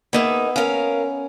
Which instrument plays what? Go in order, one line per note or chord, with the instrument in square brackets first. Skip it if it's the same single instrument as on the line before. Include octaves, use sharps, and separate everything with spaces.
[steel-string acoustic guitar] A#3 D#4 G#4 [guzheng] B3 E5
[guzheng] C#4 [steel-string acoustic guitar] A#4 F5